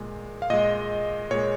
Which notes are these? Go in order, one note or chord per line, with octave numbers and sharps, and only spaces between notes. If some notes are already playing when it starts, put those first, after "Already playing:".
Already playing: A#2 G#3
F5
A#2 G#3 D#5
A#2 G#3 C#5